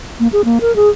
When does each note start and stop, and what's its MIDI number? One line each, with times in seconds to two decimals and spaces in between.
0.20 0.28 58
0.33 0.45 68
0.45 0.59 58
0.61 0.75 70
0.76 0.89 68